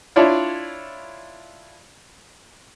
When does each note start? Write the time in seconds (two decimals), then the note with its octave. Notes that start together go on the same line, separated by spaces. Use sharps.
0.16 D4 E4 F4 C#5 D5